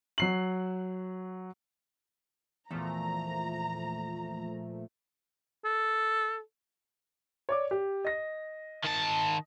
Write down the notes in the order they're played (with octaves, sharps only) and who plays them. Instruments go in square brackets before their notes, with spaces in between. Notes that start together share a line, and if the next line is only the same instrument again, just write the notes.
[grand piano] F#3 C7 F#7
[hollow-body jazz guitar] E2 [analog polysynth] A#2 F3 A3 [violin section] A#5
[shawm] A4
[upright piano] C#5 D5 D6
G4
D#5 A#6
[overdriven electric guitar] D#3 A5